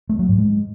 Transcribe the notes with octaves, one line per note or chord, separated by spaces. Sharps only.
A3
F#3
G#2
G#3